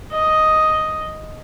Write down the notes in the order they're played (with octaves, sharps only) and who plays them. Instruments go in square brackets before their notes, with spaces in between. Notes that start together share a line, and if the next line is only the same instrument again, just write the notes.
[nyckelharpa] D#5